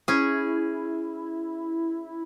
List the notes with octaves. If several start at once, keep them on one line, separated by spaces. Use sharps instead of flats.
C#4 E4 G#4